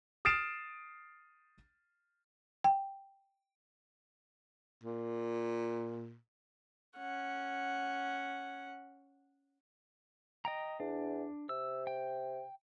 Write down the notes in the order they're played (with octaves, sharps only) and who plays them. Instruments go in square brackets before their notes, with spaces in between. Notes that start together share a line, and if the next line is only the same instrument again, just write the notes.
[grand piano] D#6 F6 A6 C7 D7 E7
[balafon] G5
[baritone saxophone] A#2
[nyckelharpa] C#4 F#5
[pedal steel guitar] D#5 G5 A#5
[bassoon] E2 [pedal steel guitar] D4
[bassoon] C3 [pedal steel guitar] E6
[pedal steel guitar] G5